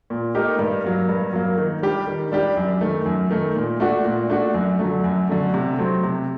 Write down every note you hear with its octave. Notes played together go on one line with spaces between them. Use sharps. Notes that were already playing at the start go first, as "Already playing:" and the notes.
A#2
A3 D#4 G4 A#4
G2
F#3 A#3
G2
F#3 A#3
D#3
G3 D4 G4
D#3
G3 D4 G4
F#2
D#3 A3
F#2
D#3 A3
A#2
A3 D4 F#4
A#2
A3 D4 F#4
F#2
D3 F#3 A3
F#2
D3 F#3 A3
C3
F#3 A3 C4
C3